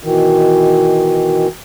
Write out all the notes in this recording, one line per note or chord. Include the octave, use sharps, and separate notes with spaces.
B2 D#3 E3